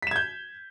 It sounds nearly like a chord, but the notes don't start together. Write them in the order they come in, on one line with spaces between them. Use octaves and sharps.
B6 E7 G#6 G6